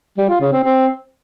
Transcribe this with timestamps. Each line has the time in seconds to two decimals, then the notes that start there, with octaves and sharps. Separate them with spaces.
0.18 G3
0.29 F4
0.41 C#3
0.52 C4
0.64 C4